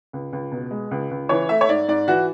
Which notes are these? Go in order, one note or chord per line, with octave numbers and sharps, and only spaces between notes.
C#2
C#2
B2
G#3
C#2
C#2
E3 C#5
A3 E5
C#5
G#2 D5
G#2 D5
E3 F#4